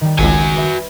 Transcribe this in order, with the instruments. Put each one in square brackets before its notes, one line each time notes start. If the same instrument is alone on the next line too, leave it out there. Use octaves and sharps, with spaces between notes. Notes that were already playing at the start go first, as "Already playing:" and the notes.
[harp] D#3 G3
[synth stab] G#1 C#2 [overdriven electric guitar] F#4 G#5
[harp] B4 E5